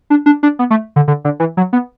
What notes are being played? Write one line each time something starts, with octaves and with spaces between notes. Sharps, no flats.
D4
D4
D4
B3
A3
D3
D3
D3
E3
F#3
B3